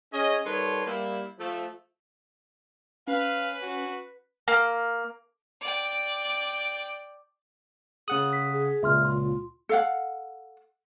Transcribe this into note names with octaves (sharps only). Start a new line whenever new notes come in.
C#4 G#4 D#5
D#3 G3 A4 B4 C#5 C6
G3 A#3 E4
F3 A3
C#4 B4 F5
F#4
A#3
D5 G5
C#3 G#4 F#5 D#6 F#7
B6
G#4
C#2 A#2 E5 C6 F6
F4 C6
A4 F5 F#5